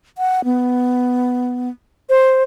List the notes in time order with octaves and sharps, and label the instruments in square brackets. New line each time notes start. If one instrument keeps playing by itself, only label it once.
[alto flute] F#5
B3
[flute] C5